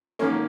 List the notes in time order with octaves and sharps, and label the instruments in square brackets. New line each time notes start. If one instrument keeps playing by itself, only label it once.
[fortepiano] G#1 F#2 D#3 A#3 C#4